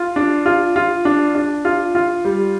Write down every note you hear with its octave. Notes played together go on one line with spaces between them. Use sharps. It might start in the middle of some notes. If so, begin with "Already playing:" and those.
Already playing: F4
D4
F4
F4
D4
D4
F4
F4
G3